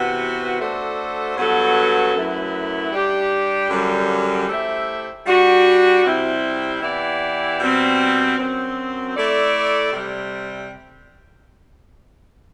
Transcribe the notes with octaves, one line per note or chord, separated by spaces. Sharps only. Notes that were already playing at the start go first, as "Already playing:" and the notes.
Already playing: C3 E3 B3 F#4
A3 D4 F#4 A4 C5
G2 F#3 B3 F#4 A4
F#2 F#3 A3 E4 B4
G3 D4 G4
F#2 D3 G3
A3 E4 G4 C5 E5
G3 D4 F#4
C3 G3 C4 E4
E3 B3 E4 G4 D5
B2 G3 C4
F#2 F#3 C4
A3 E4 A4 D5
C3 G3